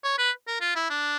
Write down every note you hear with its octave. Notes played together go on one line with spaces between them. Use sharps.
C#5
B4
A#4
F4
E4
D4